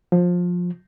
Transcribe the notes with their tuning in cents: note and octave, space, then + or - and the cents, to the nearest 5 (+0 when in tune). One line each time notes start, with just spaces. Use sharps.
F3 +20